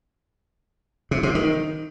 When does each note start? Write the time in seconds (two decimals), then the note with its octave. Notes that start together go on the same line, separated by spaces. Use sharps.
1.11 C3
1.23 C3
1.35 D#3